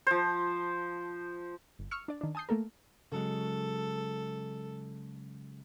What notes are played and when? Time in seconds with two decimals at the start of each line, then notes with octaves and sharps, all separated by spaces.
0.07 F3 C5
1.79 G1
1.91 C#6 E6 F6 C#7
2.08 D4 D5
2.21 D#3 D4
2.35 G#5 A5 D#6 G6 C7
2.49 A3 A#3 A4 A#4
3.12 C#3 F#3 G#3 A4